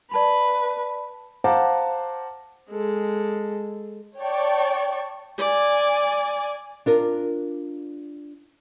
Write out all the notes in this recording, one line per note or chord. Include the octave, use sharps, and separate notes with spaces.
B4 D5 A5 B5
C5 F5 F#5 A5 A#5 D6
G#3 A4
C#5 D5 G5 A5 C#6
D5 G#5
D4 F4 A#4